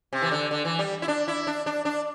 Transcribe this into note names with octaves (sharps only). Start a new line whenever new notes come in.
C3
E3
D3
D3
E3
G3
E4
D4
E4
D4
D4
D4